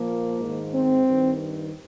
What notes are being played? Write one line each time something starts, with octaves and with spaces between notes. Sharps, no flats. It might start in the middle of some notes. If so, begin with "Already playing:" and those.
Already playing: A#2 F3 A#3
G#2 D#3
C4
G2 D#3